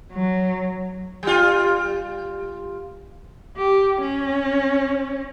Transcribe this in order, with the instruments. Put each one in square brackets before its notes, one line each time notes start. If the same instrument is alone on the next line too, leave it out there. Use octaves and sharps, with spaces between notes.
[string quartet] F#3
[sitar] G3 F4
[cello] G4
C#4